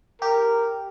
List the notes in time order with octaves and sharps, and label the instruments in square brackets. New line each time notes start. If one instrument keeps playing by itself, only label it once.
[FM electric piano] G4 [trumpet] A#4